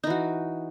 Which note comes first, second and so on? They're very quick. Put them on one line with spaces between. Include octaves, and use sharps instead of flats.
D#4 E3 F#4